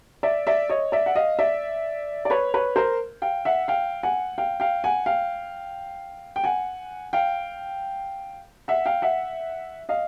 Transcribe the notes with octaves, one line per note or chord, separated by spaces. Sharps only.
D5 E5
D5 E5
C#5 D#5
D5 E5
F#5
D#5 F5
D5 E5
D5
B4 C#5
B4 C#5
A#4 C5
F5 G5
E5 F#5
F5 G5
F#5 G#5
F5 G5
F5 G5
F#5 G#5
F5 G5
G5
F#5 G#5
F5 G5
E5 F#5
F5 G5
E5 F#5
D#5 F5